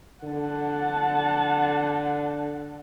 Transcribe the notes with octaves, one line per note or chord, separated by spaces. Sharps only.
D3 F#5 A5